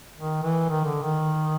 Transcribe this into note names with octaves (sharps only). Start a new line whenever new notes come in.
D#3
E3
D#3
D3
D#3